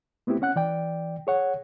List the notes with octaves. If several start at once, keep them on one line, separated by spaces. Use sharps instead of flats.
A3 B3 C4 E4 G4
C#4 F#5 F#6
E3 D5 G5
G#4 C#5 F#5